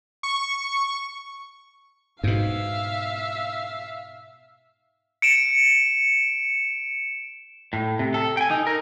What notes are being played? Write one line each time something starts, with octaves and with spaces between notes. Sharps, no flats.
C#6
G#2 B2 E5 F5
C#7 D7 E7
A2
C3
A4
G5 G#5
D#4
A#4